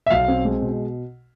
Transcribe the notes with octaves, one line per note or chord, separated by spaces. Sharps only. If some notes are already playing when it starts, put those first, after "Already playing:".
E5
B1 F5
C4
G#3
B2